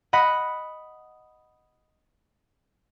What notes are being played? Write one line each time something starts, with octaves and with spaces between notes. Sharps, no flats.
D#5 F#5 B5